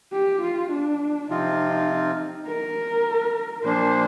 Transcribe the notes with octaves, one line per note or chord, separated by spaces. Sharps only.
G4
F4
D4
C3 F3 C4 D#4 F4
A#4
A#2 F3 A#3 D4 C5